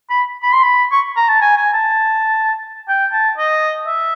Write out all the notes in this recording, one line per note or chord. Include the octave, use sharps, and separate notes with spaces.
B5
B5
C6
B5
C#6
A#5
A5
G#5
G#5
A5
G5
A5
D#5
E5